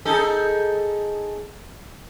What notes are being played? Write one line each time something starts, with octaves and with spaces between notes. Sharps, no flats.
D#4 G#4 A4